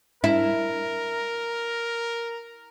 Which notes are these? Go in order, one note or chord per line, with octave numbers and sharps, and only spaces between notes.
E4 A#4